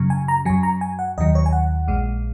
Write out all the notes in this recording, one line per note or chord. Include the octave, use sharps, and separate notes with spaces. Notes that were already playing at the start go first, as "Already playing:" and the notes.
Already playing: F#2 C#3 F#3
G#5
A#5
F#2 F#3 G#5
A#5
G#5
F#5
D#2 D#3 F#3 D#5
C#5
G#5
F#5
A#1 A#2 G#3